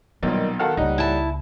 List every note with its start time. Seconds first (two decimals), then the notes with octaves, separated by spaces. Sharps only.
0.23 B1 A#2 D#3 G3 B3
0.59 D#3 F#4 A4 F5
0.77 C#2 A2 G3 A#3 D#4 F#5
0.98 E4 A5